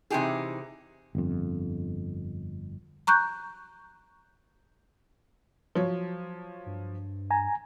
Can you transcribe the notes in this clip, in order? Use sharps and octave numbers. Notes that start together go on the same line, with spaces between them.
C3 E3 D#4 G4 G#4
G1 F2
A#5 C#6 F#6 G6
F3 F#3 C#5
G2
G#5 A#5